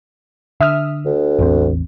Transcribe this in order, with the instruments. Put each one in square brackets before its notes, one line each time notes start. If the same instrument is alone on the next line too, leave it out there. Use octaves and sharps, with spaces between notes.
[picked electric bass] D3 [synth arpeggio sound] E5 D#6 F6
[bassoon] D2
[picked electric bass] A1 E2 C4